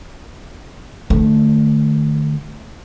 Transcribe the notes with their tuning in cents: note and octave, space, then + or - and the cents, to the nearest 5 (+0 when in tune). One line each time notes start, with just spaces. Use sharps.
D3 +40 A3 +0